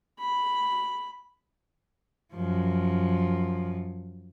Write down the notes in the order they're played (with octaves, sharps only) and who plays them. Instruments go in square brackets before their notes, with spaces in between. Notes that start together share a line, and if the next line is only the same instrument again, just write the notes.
[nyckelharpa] B5
[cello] F#2 F3